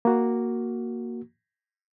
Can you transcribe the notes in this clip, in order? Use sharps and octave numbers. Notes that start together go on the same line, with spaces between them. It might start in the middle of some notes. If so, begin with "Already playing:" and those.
A#3 F#4